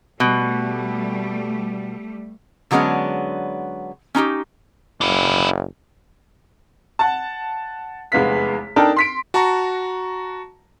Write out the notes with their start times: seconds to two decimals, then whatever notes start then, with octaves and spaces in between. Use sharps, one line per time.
0.20 B2 G3 A3
2.71 D3 F#3 G#3 B3 C#4 D4
4.15 C#4 D#4 F4 G4
5.01 F#1 D4 E4
6.99 F#5 A5
8.12 F1 E2 G#3 B3 F5 B6
8.76 D4 D#4 A4 A#4 G5 A5
8.96 C6 B6 D7
9.34 F#4 A5 A#5 C#6